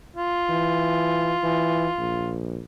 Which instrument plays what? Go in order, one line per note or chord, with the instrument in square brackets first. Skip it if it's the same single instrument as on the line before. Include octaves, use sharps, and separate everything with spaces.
[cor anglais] F4
[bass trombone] E3
E3
A#1